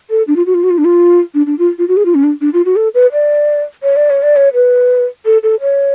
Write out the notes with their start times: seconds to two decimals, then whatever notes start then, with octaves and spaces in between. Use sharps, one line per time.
0.10 A4
0.27 D4
0.36 F4
0.46 F#4
0.54 F4
0.64 F#4
0.70 F4
0.78 D4
0.85 F4
1.34 D4
1.46 D4
1.59 F4
1.78 F4
1.88 F#4
1.97 G#4
2.05 F4
2.15 C#4
2.24 D4
2.41 D4
2.53 F4
2.65 F#4
2.76 A4
2.94 B4
3.12 D5
3.83 C#5
3.96 D5
4.10 C#5
4.22 D5
4.36 C#5
4.54 B4
5.25 A4
5.43 A4
5.61 C#5